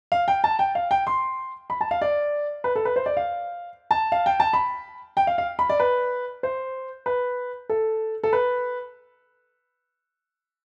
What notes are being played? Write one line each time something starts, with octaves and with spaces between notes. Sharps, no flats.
F5
G5
A5
G5
F5
G5
C6
B5
A5
F5
D5
B4
A4
B4
C5
D5
F5
A5
F5
G5
A5
B5
G5
F5
F5
B5
D5
B4
C5
B4
A4
A4
B4